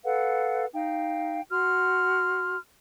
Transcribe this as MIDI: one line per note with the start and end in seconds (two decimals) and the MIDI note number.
0.05 0.66 69
0.05 0.66 71
0.05 0.66 77
0.05 0.66 78
0.74 1.41 63
0.74 1.41 77
0.74 1.41 79
1.50 2.56 66
1.50 2.56 84
1.50 2.56 89